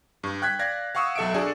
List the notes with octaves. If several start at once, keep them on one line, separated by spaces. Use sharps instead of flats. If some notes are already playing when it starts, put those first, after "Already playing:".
G2
G5 F#6 G#6 B6
D5 F5 G#6 A#6
F5 F#5 C#6 D#6 E6
B1 A4 E5 C#7 D7
D4 F#4 G#4 A4 D5